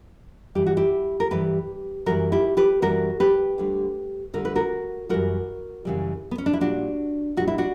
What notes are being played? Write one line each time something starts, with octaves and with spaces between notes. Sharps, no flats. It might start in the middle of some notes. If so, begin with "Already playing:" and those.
G2 E3 G3 G4
F#4
E4 G4
A#4
G2 E3 G3 G4 B4
F#2 E3 G3 F#4 A#4
E4 G4
G4 B4
F#2 E3 G3 F#4 A#4
G4 B4
D2 D3 G3
D2 D3 G3 A#4
B4
F#4 A#4
F#2 C#3 E3 G3 F#4 A#4
F#2 C#3 E3 G3
B3
C#4
D4
E4
A#2 G3 D4 F#4
A#2 G3 F#4
E4
D4 F#4